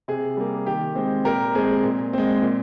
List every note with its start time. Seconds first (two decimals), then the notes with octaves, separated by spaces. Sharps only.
0.08 C3 G#4
0.37 G3 A#3
0.66 D#3 G4
0.95 G#3 C4
1.25 A#2 G4 A#4
1.55 G#3 C4 G#4
1.84 A#2
2.13 G#3 C4
2.42 A#2